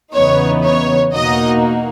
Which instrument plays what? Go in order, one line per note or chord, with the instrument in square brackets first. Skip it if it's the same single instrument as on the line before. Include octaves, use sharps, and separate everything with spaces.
[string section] E2 C#3 E3 B3 D#4 [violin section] C#5
[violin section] C#5
[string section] E2 B2 A#3 D#4 F#4 [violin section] D#5